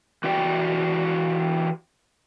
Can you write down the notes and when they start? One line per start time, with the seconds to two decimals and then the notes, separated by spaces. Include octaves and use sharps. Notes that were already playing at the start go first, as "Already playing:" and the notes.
0.24 E3 F#4 G4 D5 G5